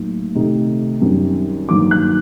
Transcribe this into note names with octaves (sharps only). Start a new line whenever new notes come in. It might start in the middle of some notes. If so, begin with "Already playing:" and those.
Already playing: A2 F#3 A#3 D#4
C3 D#3 A3 D#4
F#2 D#3 G3 C4
G2 D#3 F#3 A#3 D6
F#6